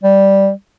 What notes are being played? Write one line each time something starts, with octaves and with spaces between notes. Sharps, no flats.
G3